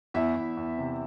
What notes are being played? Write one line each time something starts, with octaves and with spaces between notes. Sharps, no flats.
E2 E4 E5
E2
E2
C3